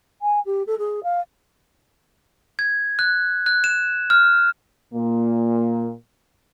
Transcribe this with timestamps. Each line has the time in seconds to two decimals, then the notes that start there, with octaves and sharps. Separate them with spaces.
0.22 G#5
0.46 G4
0.67 A4
0.78 G#4
1.03 F5
2.59 G#6
2.99 F#6
3.46 F#6
3.64 E7
4.10 F6
4.94 A#2 A#3